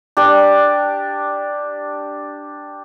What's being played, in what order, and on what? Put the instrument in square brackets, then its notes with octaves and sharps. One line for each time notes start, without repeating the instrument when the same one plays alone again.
[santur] D4 G4 D5